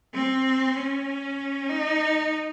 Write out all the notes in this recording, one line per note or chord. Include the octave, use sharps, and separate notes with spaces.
C4
C#4
D#4